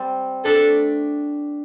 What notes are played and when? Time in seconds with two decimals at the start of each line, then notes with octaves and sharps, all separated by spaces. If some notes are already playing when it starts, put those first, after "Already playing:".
Already playing: G3 C4
0.45 A3 D4 A4